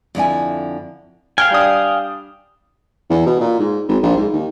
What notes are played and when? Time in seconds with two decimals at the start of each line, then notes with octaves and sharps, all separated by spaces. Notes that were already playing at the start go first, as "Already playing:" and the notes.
0.15 F2 D3 E4 G#5
1.38 F5 G5 G#5 F6
1.50 G3 D4 D#6
3.10 E2
3.26 B2
3.41 A#2
3.59 G#2
3.88 G#1
4.03 A#1
4.17 G#2
4.33 D#2